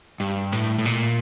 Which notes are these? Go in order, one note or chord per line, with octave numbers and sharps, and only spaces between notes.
G2
A2
A2
A#2